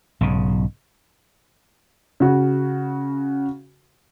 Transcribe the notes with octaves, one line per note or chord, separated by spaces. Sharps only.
B1 G#2 C#3
C#3 F#4